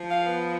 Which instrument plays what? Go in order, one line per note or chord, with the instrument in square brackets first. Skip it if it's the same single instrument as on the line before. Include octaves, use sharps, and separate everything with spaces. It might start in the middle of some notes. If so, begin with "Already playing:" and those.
Already playing: [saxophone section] F3
[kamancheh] F5
[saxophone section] B3